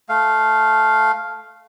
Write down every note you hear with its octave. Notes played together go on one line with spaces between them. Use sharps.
A3 F5